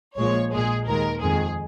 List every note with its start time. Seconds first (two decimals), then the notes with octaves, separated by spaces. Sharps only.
0.18 A#1 A#2 F3 G#3 C#5
0.53 A#1 A#2 G#3 G#4
0.87 D#2 D#3 G#3 A#4
1.22 F2 D#3 G#3 G#4